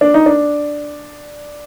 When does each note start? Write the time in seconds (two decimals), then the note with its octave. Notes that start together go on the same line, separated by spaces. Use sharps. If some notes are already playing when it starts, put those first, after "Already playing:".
0.01 D4
0.14 D#4
0.26 D4